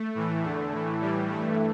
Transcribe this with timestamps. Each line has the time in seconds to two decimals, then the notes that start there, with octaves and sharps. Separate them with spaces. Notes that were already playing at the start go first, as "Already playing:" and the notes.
Already playing: A3
0.15 A2 E3
0.43 E2 D3 A3
0.71 A2 E3
1.00 A2 E3 G3
1.29 G2 E3 A3